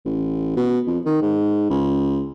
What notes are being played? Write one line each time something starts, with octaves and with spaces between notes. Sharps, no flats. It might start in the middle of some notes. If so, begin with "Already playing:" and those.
A1
B2
F2
D#3
G#2
C#2